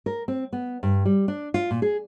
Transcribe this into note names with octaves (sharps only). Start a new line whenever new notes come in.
A#4
C4
B3
G2
G3
D4
F4
A#2
G#4